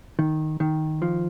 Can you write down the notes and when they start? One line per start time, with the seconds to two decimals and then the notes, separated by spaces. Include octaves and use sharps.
0.19 D#3
0.60 D#3
1.02 F3